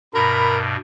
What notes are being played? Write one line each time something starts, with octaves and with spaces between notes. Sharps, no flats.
G2 B2 A#4 B5